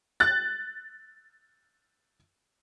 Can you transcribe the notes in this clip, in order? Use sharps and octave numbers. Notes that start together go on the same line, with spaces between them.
F#6 A6